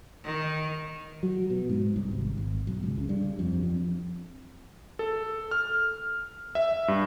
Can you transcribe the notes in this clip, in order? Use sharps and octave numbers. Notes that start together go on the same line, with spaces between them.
D#3
F#3
B2
G#2
C2
G#1
G#1
B1
C#2
C#3
G2
F2
F2
A4
F6
E5
G2